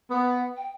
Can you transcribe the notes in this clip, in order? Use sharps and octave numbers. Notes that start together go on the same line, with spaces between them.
B3 F#5
G5